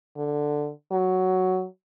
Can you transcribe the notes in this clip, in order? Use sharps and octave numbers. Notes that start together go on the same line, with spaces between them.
D3
F#3